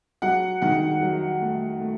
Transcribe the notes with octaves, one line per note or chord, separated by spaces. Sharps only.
F#3 F#5
D#3 F#5
F#3
A3
A3